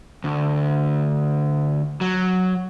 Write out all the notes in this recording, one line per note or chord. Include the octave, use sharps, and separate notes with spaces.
D2
F#3